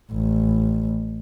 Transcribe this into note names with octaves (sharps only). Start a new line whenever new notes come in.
A1